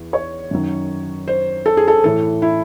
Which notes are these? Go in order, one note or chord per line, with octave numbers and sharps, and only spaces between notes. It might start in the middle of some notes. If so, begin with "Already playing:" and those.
Already playing: E2
C#5
F#2 D#3 F#3
C5
A4
G#4
A4
A2 E3 A4
E4